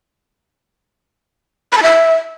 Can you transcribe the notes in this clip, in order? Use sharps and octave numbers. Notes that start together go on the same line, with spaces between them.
B5
A5
E5